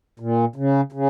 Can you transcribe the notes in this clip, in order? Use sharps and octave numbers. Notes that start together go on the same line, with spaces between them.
A#2
C#3
C#3